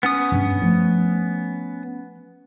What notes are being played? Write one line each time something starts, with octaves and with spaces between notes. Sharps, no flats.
B3 C#4 D#6
G2
F3 A3